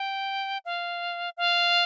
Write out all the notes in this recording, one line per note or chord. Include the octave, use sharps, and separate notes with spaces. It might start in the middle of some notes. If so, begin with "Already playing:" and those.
Already playing: G5
F5
F5